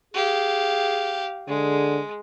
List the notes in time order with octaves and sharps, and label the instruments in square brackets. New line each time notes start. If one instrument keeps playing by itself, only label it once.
[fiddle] G4 F5 [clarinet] G#4
[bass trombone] D3 [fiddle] G#3 [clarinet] G#4